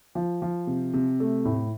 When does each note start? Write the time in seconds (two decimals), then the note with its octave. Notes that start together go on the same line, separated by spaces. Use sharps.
0.15 F3
0.42 F3
0.67 C3
0.94 C3
1.20 A3
1.45 A2